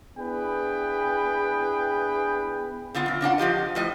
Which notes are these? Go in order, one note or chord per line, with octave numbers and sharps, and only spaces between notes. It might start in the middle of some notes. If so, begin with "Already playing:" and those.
B3 D4 E4 G#4 B4 G5
D3 B3 F4 F#5
F#2 A#2
C#3 D4 F4 F#5
F3 F4 G4 D#5
A2 F3 D#5